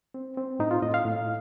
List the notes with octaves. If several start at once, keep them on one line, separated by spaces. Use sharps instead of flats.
C4
C4
A2 D#4
F4
A2 D#5
F5
A2